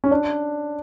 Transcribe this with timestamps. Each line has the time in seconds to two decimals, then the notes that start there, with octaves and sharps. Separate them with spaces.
0.04 C#4
0.11 D4